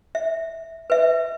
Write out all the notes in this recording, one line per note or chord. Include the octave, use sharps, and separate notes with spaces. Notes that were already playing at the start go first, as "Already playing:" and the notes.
E5
B4 E5